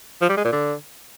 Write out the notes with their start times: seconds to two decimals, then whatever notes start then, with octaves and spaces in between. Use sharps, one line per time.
0.21 F3
0.29 G3
0.37 G#3
0.45 A#2
0.52 D3